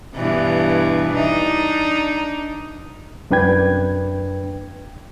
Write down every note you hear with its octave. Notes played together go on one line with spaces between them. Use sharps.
G2 B2 E3
D4 D#4
C2 F#2 D4 B4 G5 G#6